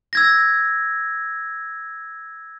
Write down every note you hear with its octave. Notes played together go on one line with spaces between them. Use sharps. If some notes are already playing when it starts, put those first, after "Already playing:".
E6 G#6 A#6